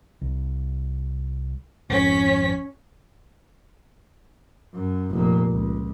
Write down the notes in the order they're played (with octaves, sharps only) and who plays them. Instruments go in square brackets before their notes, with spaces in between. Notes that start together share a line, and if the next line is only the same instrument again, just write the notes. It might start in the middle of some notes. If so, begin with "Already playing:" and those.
[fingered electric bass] C2
[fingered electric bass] G#1 F2 [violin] C#4 B6
[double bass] F#2
F1 A#2
C#2